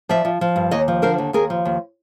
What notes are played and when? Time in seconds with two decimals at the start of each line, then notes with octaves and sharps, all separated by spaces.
0.09 F3 D5 E5
0.25 F3
0.41 F3
0.56 G2
0.71 D#2 C#5 D#5
0.88 F3
1.02 D3 A#4 C5
1.18 D#2
1.33 D#2 G#4 A#4
1.50 F3
1.65 D#2